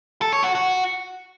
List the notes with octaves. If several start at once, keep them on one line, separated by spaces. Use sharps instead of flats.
A4
C#5
F#4
F#4